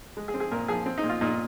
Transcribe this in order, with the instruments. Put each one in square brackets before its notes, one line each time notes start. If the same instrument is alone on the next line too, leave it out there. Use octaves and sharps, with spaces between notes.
[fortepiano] G#3
G#4
C4
G#4
A#2 A#4
F3 G#4
C4
D#4
A#2
F4
A#2 D#4